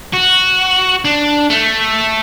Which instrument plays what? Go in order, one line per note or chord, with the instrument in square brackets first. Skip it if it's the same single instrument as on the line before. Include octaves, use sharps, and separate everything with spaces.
[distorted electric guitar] F#4
D4
A3